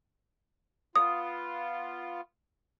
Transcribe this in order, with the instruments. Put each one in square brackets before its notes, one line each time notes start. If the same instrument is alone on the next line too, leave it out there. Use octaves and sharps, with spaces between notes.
[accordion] B3 F4 [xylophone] D#6